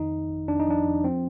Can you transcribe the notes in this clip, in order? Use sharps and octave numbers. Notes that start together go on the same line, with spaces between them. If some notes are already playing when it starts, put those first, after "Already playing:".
Already playing: F2 D#3 D#4
F2
G1
F2 D4
D#4
F3 D4
F2
F3 C4